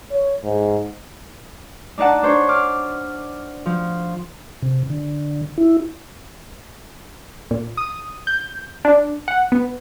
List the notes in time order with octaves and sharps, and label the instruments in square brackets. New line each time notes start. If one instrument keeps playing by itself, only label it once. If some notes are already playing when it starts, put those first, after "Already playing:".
[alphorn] C#5
G#2
[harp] D4 D#4 D5 F#5 A5
D4 C5 C#5
D6 F6
F3
[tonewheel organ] C3
D3
E4
[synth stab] A#2
D#6
G6
D4
F#5
B3